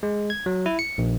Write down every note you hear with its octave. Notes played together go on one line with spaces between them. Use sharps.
G#3
G#6
F#3
E4
C#7
A#1